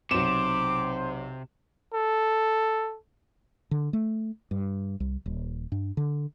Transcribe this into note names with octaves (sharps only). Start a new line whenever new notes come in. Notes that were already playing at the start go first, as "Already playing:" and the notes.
B1 C3 C5 D6 E7
A4
D3
A3
G2
C2
D#1
G2
D3